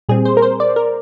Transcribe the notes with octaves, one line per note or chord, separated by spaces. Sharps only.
A#2 G3 C4 G#4
C5
A#4
C5
D5
A#4